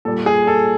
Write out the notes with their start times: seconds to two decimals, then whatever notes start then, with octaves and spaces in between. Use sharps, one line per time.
0.05 A#2 G3 A4
0.26 G#4
0.47 A4